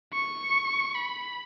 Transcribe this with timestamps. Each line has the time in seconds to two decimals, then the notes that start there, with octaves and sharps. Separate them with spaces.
0.13 C#6
0.95 B5